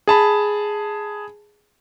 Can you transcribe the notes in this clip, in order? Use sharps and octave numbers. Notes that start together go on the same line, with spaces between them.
G#4 A5 B5